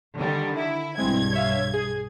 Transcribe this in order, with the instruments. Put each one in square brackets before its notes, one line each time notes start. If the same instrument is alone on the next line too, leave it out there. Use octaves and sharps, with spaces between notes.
[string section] D3 D#3 G3
E4
[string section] B1 G2 G#6 [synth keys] G#3 C4 E4
[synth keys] C#5 E5 F5
G#4